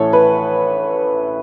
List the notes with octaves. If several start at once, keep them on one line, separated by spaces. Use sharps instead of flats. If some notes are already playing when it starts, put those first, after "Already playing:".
Already playing: A1 A2 E3 A4 C#5
B4